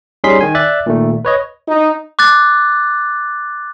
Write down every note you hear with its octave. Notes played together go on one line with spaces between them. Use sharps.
G3 C#4 D#4 G#4 C6 B6
D#3 G#5
D5 E5 F#6 A6
A#2 D#3 A3
B4 C#5 D#5
D#4
D6 F#6 A6